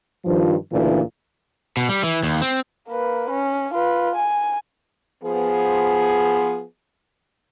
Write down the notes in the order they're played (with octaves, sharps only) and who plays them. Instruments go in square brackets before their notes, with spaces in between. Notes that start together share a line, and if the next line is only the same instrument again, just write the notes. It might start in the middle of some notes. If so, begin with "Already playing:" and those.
[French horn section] G2 D#3 F3
D2 A#2 C#3 E3 D4
[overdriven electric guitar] B2
G3
E3
D#2
C4
[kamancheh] A#3 B4
C#4
F4 B4
G#5
[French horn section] F3 B3 G#4